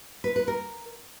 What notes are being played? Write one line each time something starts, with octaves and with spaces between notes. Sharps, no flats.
B4
B4
A#4